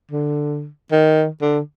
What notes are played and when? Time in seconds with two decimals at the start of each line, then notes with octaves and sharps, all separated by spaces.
0.12 D3
0.92 D#3
1.42 D3